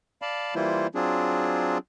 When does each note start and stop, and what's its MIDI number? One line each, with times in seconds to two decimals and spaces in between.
0.22 0.54 74
0.22 0.54 77
0.22 0.54 81
0.22 0.54 83
0.55 0.87 52
0.55 0.87 55
0.55 0.87 58
0.55 0.87 64
0.55 0.87 65
0.55 0.87 72
0.95 1.78 54
0.95 1.78 60
0.95 1.78 62
0.95 1.78 65
0.95 1.78 68